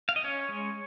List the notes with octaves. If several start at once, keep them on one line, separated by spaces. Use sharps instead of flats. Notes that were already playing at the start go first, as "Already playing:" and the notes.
F5
D#5
C#4 C#5
G#3